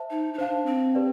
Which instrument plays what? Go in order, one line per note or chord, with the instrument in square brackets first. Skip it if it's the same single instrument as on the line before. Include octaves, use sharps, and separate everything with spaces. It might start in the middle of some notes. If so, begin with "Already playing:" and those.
Already playing: [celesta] C5 E5 A5
[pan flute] D#4
D#4
[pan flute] D4 [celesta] C5 F5 A5
[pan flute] C4
[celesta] G4 B4 D5 G5